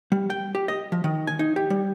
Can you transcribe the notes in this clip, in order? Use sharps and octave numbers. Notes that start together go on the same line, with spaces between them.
G3
G5
G4
D#5
F3
D#3
G#5
D#4
G4
G3